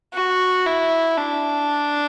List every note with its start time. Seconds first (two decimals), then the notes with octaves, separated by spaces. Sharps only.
0.14 F#4
0.66 E4
1.17 D4